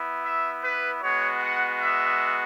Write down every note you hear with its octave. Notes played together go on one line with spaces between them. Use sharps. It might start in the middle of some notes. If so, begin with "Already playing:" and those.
Already playing: B3 E4
E5
B4
G#3 B3 F#4 C#5
F#5
E5